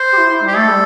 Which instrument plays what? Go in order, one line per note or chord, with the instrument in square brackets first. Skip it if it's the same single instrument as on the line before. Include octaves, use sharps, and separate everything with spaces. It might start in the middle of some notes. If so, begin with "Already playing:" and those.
Already playing: [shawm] C5
[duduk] G4
E4
E4
[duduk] G3 [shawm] G4
[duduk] A3 [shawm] A4
[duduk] G3